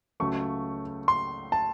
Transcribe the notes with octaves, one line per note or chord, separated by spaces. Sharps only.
C#2 C#3 F#3 A3 C#6
C6
A5